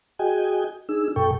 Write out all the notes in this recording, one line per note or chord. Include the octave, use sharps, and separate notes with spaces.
F#4 G#4 D#5 G5 G#5
D4 D#4 G#4 E6
F#2 B2 A4 G5 C#6